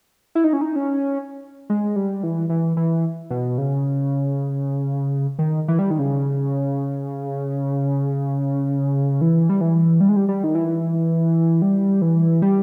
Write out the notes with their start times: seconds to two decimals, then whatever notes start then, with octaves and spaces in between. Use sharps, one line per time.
0.35 E4
0.44 D#4
0.53 C#4
0.61 D#4
0.76 C#4
1.70 G#3
1.96 G3
2.23 E3
2.50 E3
2.77 E3
3.30 B2
3.58 C#3
5.39 D#3
5.68 E3
5.79 G3
5.91 D#3
5.99 C#3
9.21 E3
9.49 G3
9.61 E3
10.01 G3
10.09 G#3
10.16 G3
10.29 G3
10.44 D#3
10.55 E3
11.62 G3
12.02 E3
12.42 G3